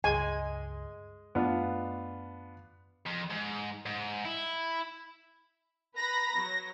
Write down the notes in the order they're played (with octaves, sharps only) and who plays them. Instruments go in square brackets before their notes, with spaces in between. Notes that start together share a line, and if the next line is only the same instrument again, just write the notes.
[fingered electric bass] C#2 G2 [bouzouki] G#3 [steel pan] G#5
[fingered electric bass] F#2 A3 [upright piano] B3 D4 F4
[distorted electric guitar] F2
G#2
G#2
E4
[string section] B4 A#5 B5 [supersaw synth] A#6
[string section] F#3